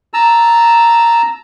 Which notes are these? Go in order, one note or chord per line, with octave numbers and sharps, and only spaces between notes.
A5 A#5 E6